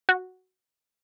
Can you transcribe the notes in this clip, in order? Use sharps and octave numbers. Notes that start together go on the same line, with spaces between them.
F#4